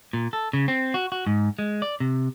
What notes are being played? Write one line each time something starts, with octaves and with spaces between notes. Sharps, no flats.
A#2
A4
C#3
C4
F#4
F#4
G#2
G#3
D5
C3